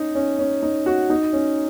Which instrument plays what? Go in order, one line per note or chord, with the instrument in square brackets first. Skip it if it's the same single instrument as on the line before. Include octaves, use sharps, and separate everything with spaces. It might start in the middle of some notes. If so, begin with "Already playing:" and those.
Already playing: [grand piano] C#4 D#4
C#4
C#4
D#4
F#4
D#4
C#4